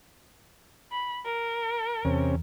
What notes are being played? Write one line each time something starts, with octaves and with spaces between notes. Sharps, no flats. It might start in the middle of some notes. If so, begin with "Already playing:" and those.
B5
A#4
E2 C3 C#4